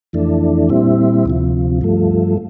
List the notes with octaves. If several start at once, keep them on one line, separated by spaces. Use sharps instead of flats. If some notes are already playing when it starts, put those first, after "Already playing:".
F2 E3 A3 D4
A#2 G3 C4 E4
D2 C3 F3
G2 F3 A3